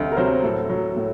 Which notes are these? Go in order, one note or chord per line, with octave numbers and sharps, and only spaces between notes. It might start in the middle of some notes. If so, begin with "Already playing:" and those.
Already playing: D2 C3 F#3 D#5 F#5
A#4
C3 F#3 C5
A2 A4
F#3
A2